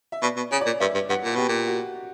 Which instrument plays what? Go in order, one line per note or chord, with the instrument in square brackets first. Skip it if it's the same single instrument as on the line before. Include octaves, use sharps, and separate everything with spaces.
[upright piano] E5
[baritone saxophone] B2 [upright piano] D5
[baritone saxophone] B2
[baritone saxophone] C#3 [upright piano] C#5
[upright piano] D5
[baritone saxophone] A#2
[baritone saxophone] G2 [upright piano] E5
[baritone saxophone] G2
[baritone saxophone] G2 [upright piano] F#5
[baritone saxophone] A#2
[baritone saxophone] B2 [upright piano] G4
[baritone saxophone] A#2
[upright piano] F#4